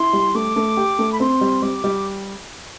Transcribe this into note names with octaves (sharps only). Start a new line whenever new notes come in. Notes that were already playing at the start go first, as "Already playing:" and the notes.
Already playing: E4 C6
G3
A3 D6
A3
G4
A3
B5
C4 C6
G3
G3 D6
G3